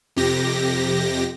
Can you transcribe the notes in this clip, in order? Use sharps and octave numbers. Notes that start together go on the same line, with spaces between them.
F2 C3 G4 A#6